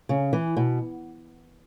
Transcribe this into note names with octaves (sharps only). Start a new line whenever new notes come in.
C#3
E3
B2